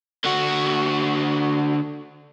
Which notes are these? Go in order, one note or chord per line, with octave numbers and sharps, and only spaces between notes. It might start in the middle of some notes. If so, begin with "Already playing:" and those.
D3 F#4